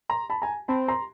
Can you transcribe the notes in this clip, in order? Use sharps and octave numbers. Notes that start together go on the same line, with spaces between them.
A#5 C6
A5 B5
G#5 A#5
C4 A5 B5
A#5 C6